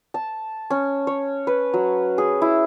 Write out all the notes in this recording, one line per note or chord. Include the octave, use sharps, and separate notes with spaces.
A5
C#4
C#5
B4
F#3
G#4
E4